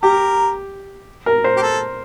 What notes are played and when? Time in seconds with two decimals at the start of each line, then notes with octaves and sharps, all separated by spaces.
0.03 G4 A#4
1.26 A#4
1.44 C5
1.57 G4
1.62 A4